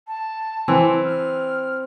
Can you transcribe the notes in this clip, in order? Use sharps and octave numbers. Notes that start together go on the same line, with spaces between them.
A5
E3 C4
F6